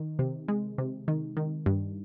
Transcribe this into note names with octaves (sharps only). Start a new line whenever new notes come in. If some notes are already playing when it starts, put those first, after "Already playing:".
Already playing: D#3
C3
G#3
C3
D#3
D#3
G2